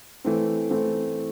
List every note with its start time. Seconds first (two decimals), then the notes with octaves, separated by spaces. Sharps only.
0.24 E3 A3 C4
0.70 E3 A3 C4